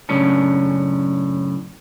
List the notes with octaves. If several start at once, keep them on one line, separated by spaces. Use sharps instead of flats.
F#2 A2 C#3 C#4 D4